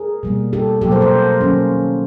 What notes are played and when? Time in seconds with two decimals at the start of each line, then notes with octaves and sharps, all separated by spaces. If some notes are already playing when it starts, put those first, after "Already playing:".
Already playing: G#4 A#4
0.23 B2 G3 A#3
0.53 G4 A4
0.81 B2 F#3 A#3 G4 A4
0.91 A#4 C5
1.01 A#4 C5
1.41 D#3 F#3 A#3 C#4